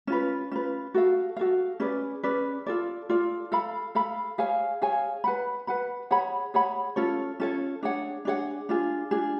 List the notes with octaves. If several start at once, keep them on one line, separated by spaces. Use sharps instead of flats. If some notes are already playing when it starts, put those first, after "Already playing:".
C#4 F4 B4
C#4 F4 B4
F#4 A4 F5
F#4 A4 F5
C#4 G#4 B4 D5
C#4 G#4 B4 D5
F4 A4 D5
F4 A4 D5
A4 F5 B5
A4 F5 B5
G#4 C#5 F5 G#5
G#4 C#5 F5 G#5
B4 F#5 B5
B4 F#5 B5
G#4 C#5 F#5 B5
G#4 C#5 F#5 B5
C#4 F4 A4 C#5
C#4 F4 A4 C#5
D4 G#4 C#5 F#5
D4 G#4 C#5 F#5
D4 F4 G#4
D4 F4 G#4